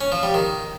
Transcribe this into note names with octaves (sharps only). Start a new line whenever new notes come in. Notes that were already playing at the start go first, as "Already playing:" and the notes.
C#4
F3
G3
D#3